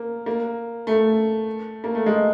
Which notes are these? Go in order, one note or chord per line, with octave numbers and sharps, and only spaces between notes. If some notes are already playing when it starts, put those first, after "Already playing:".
Already playing: A#3
A#3
A3
A#3
A3
G#3